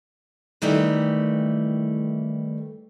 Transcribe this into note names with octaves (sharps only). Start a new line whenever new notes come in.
D#3 E3 G3 A3